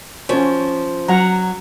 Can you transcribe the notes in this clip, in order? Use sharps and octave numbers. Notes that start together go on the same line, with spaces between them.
F3 C#4 C#5
F#3 F#5 A#5